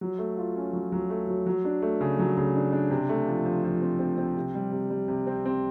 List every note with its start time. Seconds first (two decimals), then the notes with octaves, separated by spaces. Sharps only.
0.01 F#3
0.19 A3
0.37 F4
0.56 C#4
0.73 F#3
0.92 F#3
1.10 A3
1.27 F#3
1.46 F#3
1.65 D4
1.82 A3
2.01 C#3
2.19 F#3
2.37 C#3
2.55 D4
2.72 D4
2.91 C3
3.09 A3
3.28 F3
3.45 F3
3.64 F3
3.82 C4
3.99 C4
4.18 C4
4.36 C3
4.55 G3
4.72 C3
4.90 G3
5.08 C3
5.27 C4
5.45 C4